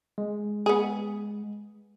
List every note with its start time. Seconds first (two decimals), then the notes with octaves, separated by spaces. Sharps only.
0.18 G#3
0.66 B3 G#4